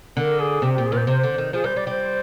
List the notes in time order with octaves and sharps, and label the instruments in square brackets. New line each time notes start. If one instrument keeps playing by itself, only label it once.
[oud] D3 [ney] A#4
[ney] G#4
[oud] C3 [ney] G4
[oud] A#2 [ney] G4
[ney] G#4
[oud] A#2 [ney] A#4 C5
[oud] C3 [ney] C5
[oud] D3
D#3
[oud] F3 [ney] G#4
[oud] G3 [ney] C5
[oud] G3 [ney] D5
[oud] G3 [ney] C5